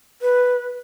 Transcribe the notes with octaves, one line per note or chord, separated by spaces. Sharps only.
B4